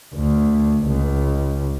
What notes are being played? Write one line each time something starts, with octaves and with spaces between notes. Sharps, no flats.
D2
C#2